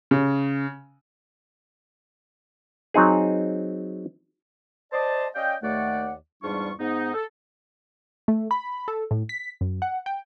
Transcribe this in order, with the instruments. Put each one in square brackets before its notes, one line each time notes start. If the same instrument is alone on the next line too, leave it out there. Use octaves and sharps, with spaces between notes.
[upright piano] C#3
[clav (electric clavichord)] F#3 C4 D#4 G#4
[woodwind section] C5 D5 D#5 A5
C#4 D5 D#5 F5 G5
D#2 A3 D5 F#5
E2 G#2 G3 D4 F4 C#6
G#2 B3 D#4
A4
[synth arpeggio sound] A3
B5
A4
A2
B6
F#2
F#5
G5